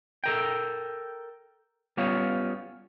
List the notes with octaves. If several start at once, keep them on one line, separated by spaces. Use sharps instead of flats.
A4 A#4 G5
G3 B3 C#4 F4 C#5